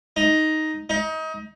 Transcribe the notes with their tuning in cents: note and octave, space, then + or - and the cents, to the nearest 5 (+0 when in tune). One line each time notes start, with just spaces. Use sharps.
D#4 +5
D#4 +30